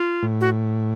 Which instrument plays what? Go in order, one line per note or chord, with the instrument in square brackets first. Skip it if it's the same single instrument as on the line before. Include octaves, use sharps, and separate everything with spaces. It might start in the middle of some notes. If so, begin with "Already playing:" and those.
Already playing: [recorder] F4
[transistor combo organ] A2
[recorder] F#4